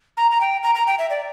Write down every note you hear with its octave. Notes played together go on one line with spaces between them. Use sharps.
A#5
A#5
G5
A#5
A#5
G5
E5
D5